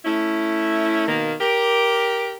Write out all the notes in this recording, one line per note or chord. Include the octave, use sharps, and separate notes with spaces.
A3 C#4 E4
B2 D#3 A#3
G4 A#4